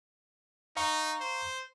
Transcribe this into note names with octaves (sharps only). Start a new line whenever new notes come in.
D#4 F5 A#5 C#6
C5